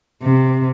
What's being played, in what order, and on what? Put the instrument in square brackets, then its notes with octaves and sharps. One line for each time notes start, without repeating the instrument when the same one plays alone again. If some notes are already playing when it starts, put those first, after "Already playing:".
[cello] C3